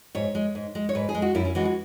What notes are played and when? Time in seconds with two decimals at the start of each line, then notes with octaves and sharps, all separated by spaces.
0.15 G#2 C#5
0.35 G#3
0.55 G#2
0.75 G#3
0.89 C#5
0.95 G#2 B4
1.09 G#4
1.15 G#3
1.22 F#4
1.35 F#2 E4
1.45 C#4
1.55 E3 G#3 F#4
1.65 F#4